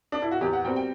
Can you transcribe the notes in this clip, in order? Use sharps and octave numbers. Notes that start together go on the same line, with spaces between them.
D4
E4
F#4
E2 G4
F#5
B2 G3 C4 G5
G5